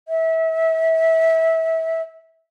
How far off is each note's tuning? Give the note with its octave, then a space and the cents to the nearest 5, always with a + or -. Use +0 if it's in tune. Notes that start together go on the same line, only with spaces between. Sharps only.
E5 -25